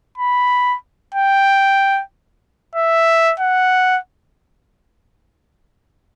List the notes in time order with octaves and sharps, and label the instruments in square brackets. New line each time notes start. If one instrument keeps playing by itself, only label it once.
[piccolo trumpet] B5
G5
E5
F#5